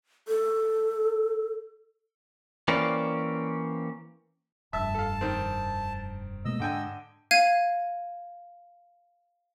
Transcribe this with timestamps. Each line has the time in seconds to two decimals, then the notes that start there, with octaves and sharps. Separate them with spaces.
0.28 A4
2.68 E3 A#3 C4 C#4 D5
4.73 F1 G2 E5 A5 E6
4.95 A4 F5
5.21 D#3 C4
6.45 B2 G#3 A#3 D#5 E6
6.60 G#2 D3 D4 G5 G#5
7.31 F5 G#6 D#7